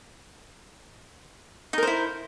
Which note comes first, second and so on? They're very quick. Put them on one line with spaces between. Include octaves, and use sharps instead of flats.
D#4 A#4 C5 E4